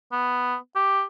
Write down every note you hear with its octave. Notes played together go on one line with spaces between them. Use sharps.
B3
G4